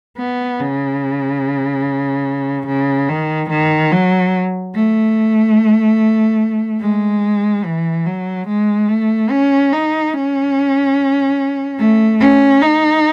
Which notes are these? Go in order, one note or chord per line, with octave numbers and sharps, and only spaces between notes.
B3
C#3
C#3
D#3
D#3
F#3
A3
G#3
E3
F#3
G#3
A3
C#4
D#4
C#4
A3
C#4
D#4